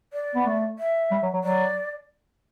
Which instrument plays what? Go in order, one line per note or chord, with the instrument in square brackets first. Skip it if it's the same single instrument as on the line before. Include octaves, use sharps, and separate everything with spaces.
[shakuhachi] D5
[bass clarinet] B3
A3
[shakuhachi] E5
[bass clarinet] G3
F#3
F#3
[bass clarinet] F#3 [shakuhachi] D5